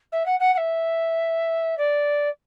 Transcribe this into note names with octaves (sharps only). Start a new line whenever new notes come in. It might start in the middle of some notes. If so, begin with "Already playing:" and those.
E5
F#5
F#5
F#5
E5
D5